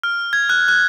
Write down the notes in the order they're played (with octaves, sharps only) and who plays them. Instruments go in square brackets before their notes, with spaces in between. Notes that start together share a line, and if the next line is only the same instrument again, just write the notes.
[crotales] F6
G#6
F#6
F#6